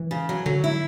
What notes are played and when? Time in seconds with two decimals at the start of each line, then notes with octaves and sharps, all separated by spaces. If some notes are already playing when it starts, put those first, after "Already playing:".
Already playing: E3
0.11 C#3
0.29 F#3
0.46 D3 F#3
0.64 E4